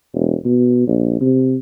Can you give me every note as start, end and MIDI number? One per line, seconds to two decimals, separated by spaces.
0.14 0.35 28
0.45 0.83 47
0.87 1.17 34
1.21 1.57 48